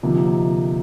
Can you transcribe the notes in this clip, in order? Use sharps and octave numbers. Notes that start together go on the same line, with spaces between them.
D2 C3 F3 A#3 D#4